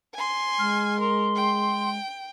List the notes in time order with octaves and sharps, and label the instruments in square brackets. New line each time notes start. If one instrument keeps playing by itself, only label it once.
[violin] G#5 C6
[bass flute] G#3 [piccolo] F6
[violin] A#4 [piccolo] C6
[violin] G5